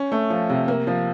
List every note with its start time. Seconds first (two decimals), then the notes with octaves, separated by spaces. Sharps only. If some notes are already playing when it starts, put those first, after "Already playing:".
Already playing: C#4
0.12 A3
0.30 F3
0.49 C3
0.68 A#3
0.87 F3